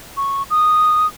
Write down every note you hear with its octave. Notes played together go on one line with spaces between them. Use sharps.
C#6
D#6